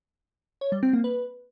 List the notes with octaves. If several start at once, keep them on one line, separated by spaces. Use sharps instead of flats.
C#5
G3
C4
A#3
B4